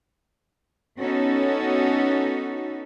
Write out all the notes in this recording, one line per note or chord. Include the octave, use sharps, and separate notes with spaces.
B3 C#4 D#4 F#4 A4